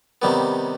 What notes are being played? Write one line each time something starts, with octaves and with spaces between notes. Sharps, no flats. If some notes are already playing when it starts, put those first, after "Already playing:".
C3 D#3 G3 B3